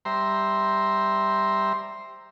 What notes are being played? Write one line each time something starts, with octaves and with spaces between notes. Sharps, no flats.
G3 C5 E5 A#5 C6